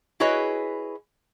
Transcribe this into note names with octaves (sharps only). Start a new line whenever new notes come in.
E4 F#4 G#4 B4 C#5 D#5